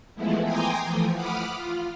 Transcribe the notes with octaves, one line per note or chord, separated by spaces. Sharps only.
E3 F3 G#3 A3 B3 E4
G5 G#5 A#5 C6 D6 D#6
E3 F3 A3
F#5 B5 D6 D#6 F6
F4